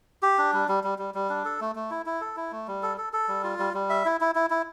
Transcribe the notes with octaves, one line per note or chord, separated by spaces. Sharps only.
G4
D4
G3
G3
G3
G3
G3
D4
A4
A3
A3
E4
E4
A4
E4
A3
G3
A4
A4
A4
G3
F4
G3
G3
E5
E4
E4
E4
E4